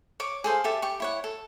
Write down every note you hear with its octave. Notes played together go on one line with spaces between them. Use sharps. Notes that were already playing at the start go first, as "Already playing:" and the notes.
C#5 D6
G#4 A4 C5 F5
G4 A4 E5 A5
G4 C#6
E4 C#5 F#5
A4